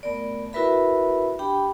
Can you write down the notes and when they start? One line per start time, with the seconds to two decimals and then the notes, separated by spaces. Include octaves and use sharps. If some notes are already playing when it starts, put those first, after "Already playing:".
0.03 A3 B3 A#4 D5
0.53 E4 F#4 A#4 B4 E5 B5
1.39 D4 G4 G5 B5